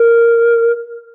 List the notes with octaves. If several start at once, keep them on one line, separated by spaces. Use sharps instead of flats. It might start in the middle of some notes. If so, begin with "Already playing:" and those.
Already playing: A#4